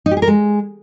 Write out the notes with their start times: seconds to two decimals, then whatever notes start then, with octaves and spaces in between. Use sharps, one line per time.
0.06 D#4
0.11 G4
0.17 G#4
0.22 A#4
0.28 G#3